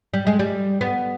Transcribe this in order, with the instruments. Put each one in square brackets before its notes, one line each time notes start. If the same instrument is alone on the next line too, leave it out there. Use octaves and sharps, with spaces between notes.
[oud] G3
G#3
G3
B3